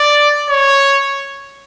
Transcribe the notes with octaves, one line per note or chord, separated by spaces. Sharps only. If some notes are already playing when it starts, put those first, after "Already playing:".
Already playing: D5
C#5